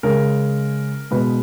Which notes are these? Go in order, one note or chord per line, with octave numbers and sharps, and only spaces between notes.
C#3 G#3 A#4
B2 G#3 B4